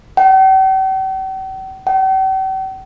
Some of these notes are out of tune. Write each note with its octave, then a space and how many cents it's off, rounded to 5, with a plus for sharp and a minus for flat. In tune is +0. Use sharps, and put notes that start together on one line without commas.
G5 -45
G5 -45